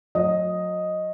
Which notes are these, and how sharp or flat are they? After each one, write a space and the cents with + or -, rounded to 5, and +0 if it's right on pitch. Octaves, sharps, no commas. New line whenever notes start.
F#3 -35 D#5 +0